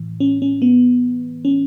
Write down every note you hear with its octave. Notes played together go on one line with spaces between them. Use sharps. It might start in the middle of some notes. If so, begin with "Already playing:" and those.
Already playing: A2 E3
C#4
C#4
B3
C#4